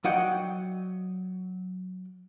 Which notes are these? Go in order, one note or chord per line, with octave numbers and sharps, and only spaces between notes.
F#3 D5 D#5 F#5 G5